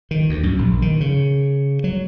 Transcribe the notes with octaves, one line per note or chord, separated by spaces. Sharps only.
D#3
D2
F#2
A#1
D#3
C#3
F#3